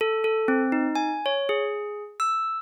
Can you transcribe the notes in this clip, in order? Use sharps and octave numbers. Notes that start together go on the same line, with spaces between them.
A4
A4
C4
D#4
G#5
C#5
G#4
E6